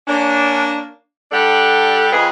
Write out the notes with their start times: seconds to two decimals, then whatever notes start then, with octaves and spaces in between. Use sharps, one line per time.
0.07 A#3 C#4 D4
1.32 G3 D4 G4 A4 F#5
2.11 F2 F3 G#4 B4 D#5